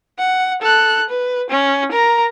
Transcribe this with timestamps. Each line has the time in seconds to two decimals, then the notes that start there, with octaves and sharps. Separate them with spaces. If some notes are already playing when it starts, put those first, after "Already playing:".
0.18 F#5
0.62 A4 F#6
1.09 B4
1.50 C#4
1.92 A#4 A#5